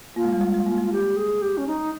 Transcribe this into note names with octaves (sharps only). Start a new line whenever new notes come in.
A#3 F4
G#3
G3
G#3
G#3
A#3
G#3
F4
G4
G#4
G4
C#4
D#4